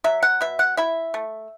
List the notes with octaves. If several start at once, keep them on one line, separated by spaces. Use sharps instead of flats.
F#3 E5
F#5
B2 E5
F#5
E4 E5
A3